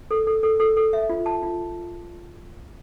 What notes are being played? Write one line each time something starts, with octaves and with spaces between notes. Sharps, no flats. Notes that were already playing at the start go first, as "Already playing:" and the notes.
A4
A4
A4
A4
A4
E5
F4
A5
F4